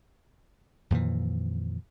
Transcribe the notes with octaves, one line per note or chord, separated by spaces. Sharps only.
F2 A#2 D#3 E3